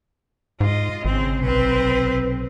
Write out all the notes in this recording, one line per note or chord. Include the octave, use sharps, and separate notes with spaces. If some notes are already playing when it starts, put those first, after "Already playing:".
G#2 F4 D#5
G#1 C#3 C4
B1 C3 C4 B4